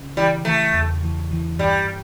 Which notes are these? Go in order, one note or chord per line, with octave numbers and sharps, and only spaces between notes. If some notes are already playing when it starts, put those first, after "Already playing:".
Already playing: C#3
E3 G3
E3 A3
E2
E3
E3
G2 G3